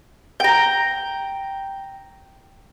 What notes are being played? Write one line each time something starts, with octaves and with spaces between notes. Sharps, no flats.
G5 A#5